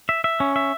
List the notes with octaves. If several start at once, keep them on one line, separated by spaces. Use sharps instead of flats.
E5
E5
C#4
E5